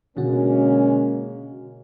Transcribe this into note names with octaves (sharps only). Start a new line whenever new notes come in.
B2 D3 G#3 A#3 C#4 F#4